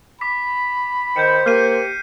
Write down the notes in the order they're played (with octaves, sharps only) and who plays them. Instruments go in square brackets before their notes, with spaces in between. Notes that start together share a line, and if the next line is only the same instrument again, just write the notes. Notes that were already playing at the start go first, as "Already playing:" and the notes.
[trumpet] B5 [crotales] D6 B6
[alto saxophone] D#3 [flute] C5 [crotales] G6 C#7
[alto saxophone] A#3 [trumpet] G4 [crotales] F6 C7 D#7